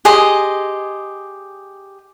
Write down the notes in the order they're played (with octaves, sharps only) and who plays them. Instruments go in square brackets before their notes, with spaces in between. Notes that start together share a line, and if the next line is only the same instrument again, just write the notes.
[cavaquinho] G4 G#4 D#5 C6